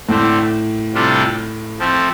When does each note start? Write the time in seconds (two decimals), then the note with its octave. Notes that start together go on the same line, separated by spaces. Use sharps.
0.08 A2 D3 A3 C4
0.94 C3 G3 D4 F4 A4
1.79 F3 A3 C4